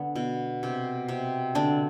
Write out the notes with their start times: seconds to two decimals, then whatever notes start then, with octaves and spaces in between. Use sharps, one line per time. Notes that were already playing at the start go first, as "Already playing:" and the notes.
Already playing: D3 B3
0.15 B2
0.63 C3
1.08 C3
1.55 D3 D4